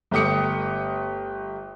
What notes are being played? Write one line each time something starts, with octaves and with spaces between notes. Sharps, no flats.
G1 A3 G4 D#6 C#7